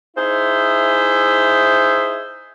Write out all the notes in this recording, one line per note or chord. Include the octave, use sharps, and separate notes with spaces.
D#4 E4 G#4 C5 E5